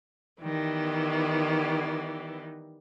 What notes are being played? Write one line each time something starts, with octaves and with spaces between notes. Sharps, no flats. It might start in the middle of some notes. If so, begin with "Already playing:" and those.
D#3 E3 G3 B3